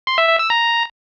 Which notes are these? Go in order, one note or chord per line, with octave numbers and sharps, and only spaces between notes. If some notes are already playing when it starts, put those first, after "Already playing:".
C6
E5
E5
E6
A#5